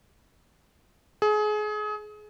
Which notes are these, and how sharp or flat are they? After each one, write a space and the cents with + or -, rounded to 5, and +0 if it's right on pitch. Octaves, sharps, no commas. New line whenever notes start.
G#4 +30